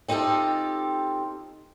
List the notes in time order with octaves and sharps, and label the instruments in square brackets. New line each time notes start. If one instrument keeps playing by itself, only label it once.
[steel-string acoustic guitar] C4 D#4 F4 G4 A4